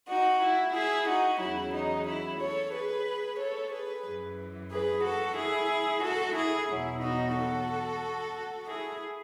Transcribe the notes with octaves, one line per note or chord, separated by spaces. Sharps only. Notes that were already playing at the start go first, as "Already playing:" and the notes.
D#4 F#4
E4
E4 G#4
D#4 F#4
E2 C#3 F#3 E4
D#4
E4
A4 C#5
G#4 B4
A4 C#5
G#4 B4
F#2 E3
G#4 B4
F#4 A4
E4 G#4
F#4 A4
E4 G#4
E2 B2 F#3 E4
D#4 F#4
F#4 A4
E4 G#4